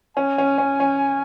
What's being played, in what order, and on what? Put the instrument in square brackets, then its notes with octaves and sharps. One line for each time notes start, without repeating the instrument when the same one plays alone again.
[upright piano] C#4 [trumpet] G#5
[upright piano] C#4
C#4
C#4